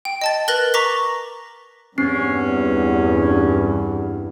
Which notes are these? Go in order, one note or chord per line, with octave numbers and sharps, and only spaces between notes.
G5
D#5 A5 A6
A#4 B4 F#6 A6 A#6 F#7
A#5 C#6 D6 A#6 B6
E2 G2 C4 C#4 C7